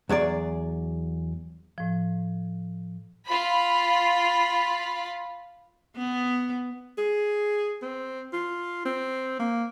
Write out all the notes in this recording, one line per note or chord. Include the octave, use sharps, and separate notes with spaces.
E2 F#3 G#4 D5
A2 F3
F4 B5
B3
G#4
C4
F4
C4
A#3